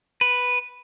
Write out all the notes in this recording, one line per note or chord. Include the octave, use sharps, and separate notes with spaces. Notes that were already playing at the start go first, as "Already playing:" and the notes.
B4